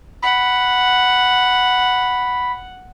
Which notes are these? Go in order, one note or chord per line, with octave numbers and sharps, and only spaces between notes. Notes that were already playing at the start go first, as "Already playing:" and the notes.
F#5 B5